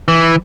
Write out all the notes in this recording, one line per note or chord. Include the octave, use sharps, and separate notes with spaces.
E3